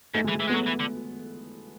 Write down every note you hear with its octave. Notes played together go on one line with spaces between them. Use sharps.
G#2 A3
G#3
E3
G#3
E3
G#3 B3
F#3 A3
E3
D3